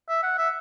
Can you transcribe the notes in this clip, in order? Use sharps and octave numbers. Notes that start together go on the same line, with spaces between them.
E5
F#5
E5